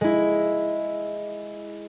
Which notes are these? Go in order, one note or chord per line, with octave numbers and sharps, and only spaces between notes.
G#3 E4